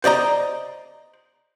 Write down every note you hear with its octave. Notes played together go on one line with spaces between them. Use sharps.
C5 D5 D#5 A#5